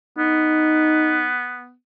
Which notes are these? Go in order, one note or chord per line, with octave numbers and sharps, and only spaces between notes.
B3 D#4